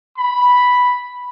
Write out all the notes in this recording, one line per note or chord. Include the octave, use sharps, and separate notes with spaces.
B5